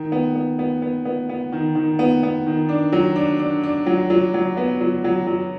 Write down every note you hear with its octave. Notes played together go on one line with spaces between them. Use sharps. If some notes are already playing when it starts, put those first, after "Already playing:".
Already playing: D#3
B3
B3
B3
B3
B3
B3
D#3
D#3
B3
B3
D#3
D4
F#3
D4
D4
D4
F#3
F#3
F#3
B3
F#3
F#3
F#3